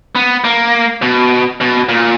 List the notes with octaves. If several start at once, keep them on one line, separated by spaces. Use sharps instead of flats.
B3
A#3
B2
B2
A#2